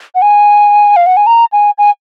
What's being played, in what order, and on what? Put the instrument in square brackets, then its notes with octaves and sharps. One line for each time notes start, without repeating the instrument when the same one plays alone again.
[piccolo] F#5
G#5
F5
F#5
G#5
A#5
G#5
G#5